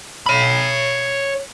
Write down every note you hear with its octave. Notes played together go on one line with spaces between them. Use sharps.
C#5 B5